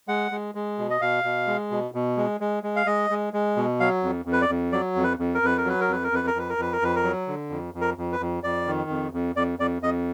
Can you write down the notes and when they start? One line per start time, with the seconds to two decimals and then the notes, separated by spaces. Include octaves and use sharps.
0.08 G#3 F#5
0.32 G#3
0.55 G#3
0.78 B2
0.90 D#5
1.01 B2 F5
1.24 B2
1.47 G#3
1.71 B2
1.94 B2
2.17 G#3
2.41 G#3
2.63 G#3
2.76 F5
2.86 G#3 D#5
3.10 G#3
3.33 G#3
3.57 B2
3.80 F#3 F5
4.03 F2
4.25 F2
4.32 B4
4.42 D5
4.49 F2
4.72 F#3 D5
4.96 F2
5.04 B4
5.19 F2
5.35 A#4
5.42 F2 B4
5.57 A#4
5.65 F#3 B4
5.81 A#4
5.88 F2 B4
6.04 A#4
6.12 F2 B4
6.27 A#4
6.34 F2 B4
6.49 A#4
6.58 F2 B4
6.73 A#4
6.82 F2 B4
6.95 A#4
7.04 F#3
7.28 D3
7.50 F2
7.74 F2
7.81 A#4
7.98 F2
8.13 B4
8.20 F2
8.43 F2 D5
8.67 D#3
8.89 F2
9.13 F2
9.36 F2 D5
9.59 F2 D5
9.82 F2 D#5